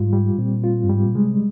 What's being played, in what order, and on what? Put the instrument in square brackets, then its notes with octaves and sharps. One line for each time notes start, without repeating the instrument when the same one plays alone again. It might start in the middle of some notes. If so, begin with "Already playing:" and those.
Already playing: [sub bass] G#2 [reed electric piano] G3 F4
[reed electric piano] G3
[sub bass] A#2 [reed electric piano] C4
[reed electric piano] F4
[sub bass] G2
[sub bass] G#2 [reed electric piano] G3
[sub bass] A#2
[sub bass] C3 [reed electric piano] G#3